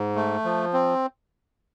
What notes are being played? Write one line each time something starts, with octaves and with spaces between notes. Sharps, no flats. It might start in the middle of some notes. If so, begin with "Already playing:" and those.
Already playing: G#2
A3
F3
C4